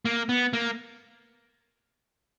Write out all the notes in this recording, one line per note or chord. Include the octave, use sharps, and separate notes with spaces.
A#3
B3
A#3